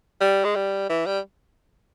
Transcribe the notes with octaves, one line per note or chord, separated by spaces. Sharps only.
G3
G#3
G3
E3
G3